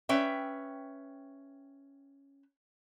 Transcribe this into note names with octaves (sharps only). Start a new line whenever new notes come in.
C#4 B4 E5 G5